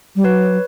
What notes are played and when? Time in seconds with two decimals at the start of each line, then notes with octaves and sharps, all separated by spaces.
0.16 G3
0.24 F#3 B4 C#5